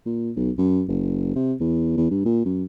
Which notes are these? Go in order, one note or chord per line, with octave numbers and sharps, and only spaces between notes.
A#2
B1
F#2
F#1
C3
E2
E2
G2
A#2
F#2